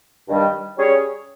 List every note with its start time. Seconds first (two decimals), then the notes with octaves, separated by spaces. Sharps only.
0.27 G2 D#3 G3
0.77 G3 C#4 G#4 C#5